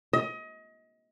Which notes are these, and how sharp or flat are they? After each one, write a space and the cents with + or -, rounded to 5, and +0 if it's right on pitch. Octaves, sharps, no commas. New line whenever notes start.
D#5 +30